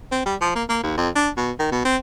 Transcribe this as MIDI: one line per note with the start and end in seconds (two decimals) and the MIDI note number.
0.12 0.24 60
0.26 0.35 55
0.41 0.55 53
0.55 0.64 58
0.69 0.79 58
0.83 0.95 39
0.97 1.09 41
1.15 1.29 62
1.37 1.52 47
1.59 1.71 51
1.72 1.84 47
1.85 1.97 60